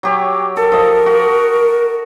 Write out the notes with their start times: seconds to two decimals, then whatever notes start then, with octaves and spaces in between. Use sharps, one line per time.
0.03 F#3 G4 C#5
0.57 A4 A#4
0.72 F3 D#5
1.06 F#4